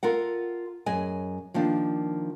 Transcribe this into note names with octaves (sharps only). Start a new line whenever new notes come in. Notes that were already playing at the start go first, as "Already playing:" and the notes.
F4 A4 A#4 F#5
F#2 G#4 D#5 G#5
D#3 F3 A#3 D4